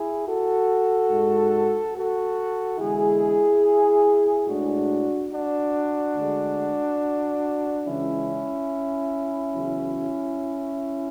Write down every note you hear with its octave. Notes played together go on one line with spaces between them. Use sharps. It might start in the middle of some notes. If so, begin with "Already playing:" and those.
Already playing: E4 G#4
F#4 A4
G#2 G#3
F#4 A4
E2 D3 G#3 E4 G#4
A2 G#3 D4 F#4
D4 F#4
D2 D3 G#3
C#2 C#3 E3 G#3 C#4 E4
E2 C#3 F#3